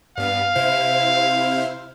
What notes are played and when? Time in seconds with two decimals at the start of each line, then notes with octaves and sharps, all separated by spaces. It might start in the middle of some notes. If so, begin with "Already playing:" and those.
0.18 G2 B3 F5
0.55 C3 E4 C5